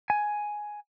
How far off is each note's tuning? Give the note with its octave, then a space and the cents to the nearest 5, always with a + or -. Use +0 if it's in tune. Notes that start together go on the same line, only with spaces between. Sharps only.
G#5 +5